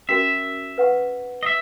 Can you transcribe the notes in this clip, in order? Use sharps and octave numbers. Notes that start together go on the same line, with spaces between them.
C#4 F#4 A#4 E5
B4 F#5 C#6
D#5
E5